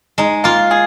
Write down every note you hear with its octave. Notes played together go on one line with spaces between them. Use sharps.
G#3 D#4
A#3 F4
G#4